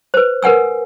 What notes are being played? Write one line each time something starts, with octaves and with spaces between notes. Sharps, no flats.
B4 C5
A#4 B4 F#5 G#5 E6